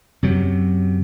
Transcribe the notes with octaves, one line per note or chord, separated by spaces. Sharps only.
F#2 C3 F#3